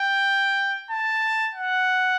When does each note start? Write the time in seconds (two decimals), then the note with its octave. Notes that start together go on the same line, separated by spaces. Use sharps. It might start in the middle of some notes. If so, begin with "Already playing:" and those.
Already playing: G5
0.91 A5
1.54 F#5